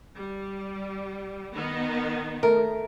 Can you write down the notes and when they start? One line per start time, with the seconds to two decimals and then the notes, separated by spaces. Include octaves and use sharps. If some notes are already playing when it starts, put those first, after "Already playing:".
0.14 G3
1.53 D#3 B3 D#4
2.43 A3 A#4